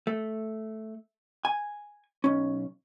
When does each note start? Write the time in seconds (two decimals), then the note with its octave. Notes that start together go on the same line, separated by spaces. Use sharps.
0.07 A3
1.45 G#5
2.24 B1 C#4